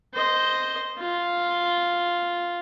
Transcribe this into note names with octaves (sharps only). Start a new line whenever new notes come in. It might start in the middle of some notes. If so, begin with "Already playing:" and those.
C5 D#5
F4